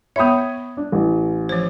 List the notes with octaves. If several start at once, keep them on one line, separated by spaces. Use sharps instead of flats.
B3 C#5 E5 B5 D#6
D4
A1
F3 C5